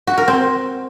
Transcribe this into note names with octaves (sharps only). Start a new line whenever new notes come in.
F#4
A#4
C4